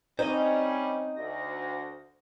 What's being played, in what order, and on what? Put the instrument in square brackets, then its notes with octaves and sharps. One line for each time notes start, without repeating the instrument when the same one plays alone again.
[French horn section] G3 C#4 [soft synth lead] C4 [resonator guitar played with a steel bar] D#4 [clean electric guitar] C5 D#5
[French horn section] D2 [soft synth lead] A#6